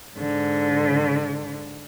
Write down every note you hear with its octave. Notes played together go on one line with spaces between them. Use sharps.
G#2 D3